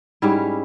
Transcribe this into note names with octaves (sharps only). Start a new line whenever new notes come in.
G#2 G3 C#4 E4